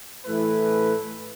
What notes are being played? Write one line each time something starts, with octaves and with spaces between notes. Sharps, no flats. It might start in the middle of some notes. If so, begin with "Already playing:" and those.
A2 E3 A3 E4 B4